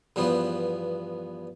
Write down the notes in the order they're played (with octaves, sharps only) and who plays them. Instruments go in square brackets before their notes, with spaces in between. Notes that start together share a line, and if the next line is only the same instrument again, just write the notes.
[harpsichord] E2 G2 F3 B3